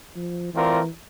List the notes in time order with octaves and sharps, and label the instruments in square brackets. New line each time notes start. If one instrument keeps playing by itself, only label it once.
[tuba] F3
[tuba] E3 [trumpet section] A3 C4 F4 A#4 D5